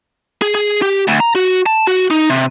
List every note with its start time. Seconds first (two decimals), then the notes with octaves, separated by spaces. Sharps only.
0.42 G#4
0.55 G#4
0.82 G4
1.08 D2
1.20 A#5
1.35 F#4
1.66 A5
1.87 F#4
2.10 D#4
2.30 C3